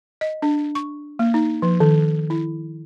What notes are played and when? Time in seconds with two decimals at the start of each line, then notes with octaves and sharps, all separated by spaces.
0.21 D#5
0.42 D4
0.75 C#6
1.19 A#3
1.34 D#4
1.62 F3
1.80 D#3
2.30 E4